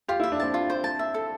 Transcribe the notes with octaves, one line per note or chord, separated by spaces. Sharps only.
F4 G4
E4
E5
D4
C4 A5
F4
C5
A5
E5
A4